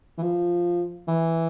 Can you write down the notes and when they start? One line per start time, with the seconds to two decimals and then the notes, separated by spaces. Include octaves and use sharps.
0.18 E3
0.23 F3
1.08 E3